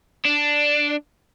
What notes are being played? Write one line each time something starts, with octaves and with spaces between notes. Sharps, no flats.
D4